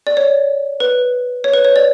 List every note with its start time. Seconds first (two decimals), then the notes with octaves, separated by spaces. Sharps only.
0.07 D5
0.17 C#5
0.80 B4
1.44 C#5
1.53 B4
1.65 C#5
1.76 D5